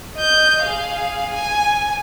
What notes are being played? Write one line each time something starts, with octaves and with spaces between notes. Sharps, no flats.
D#5 G6
G#4 F5
G#5